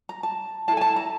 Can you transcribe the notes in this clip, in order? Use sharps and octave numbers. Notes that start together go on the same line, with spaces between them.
A#5
A5
E4 A4 A5
G#5
A5
A#5